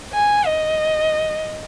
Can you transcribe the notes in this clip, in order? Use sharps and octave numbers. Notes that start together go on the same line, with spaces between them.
G#5
D#5